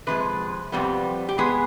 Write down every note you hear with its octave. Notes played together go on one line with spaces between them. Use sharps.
C3 F3 G#3 B4
F2 C3 G3 B3
G4
B2 G#3 B3 G#4